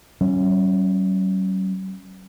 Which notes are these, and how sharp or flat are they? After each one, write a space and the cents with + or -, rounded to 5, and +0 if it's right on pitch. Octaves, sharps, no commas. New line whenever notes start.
F#3 +45 C#4 -10